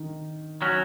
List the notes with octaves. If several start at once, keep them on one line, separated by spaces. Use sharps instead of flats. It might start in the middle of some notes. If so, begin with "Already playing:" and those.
Already playing: D#3
F#3 C#4